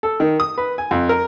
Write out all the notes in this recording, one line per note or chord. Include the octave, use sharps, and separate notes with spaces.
A4
D#3
D#6
B4
G#5
F2
A#4